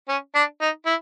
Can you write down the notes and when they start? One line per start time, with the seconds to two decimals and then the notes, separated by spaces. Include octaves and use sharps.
0.08 C#4
0.35 D4
0.61 D#4
0.86 E4